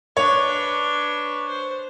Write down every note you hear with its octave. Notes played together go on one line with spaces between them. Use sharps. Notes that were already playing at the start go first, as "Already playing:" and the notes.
D4 B4 C#5
C5